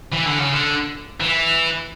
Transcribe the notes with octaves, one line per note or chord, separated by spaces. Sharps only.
E3
D3
C#3
D3
E3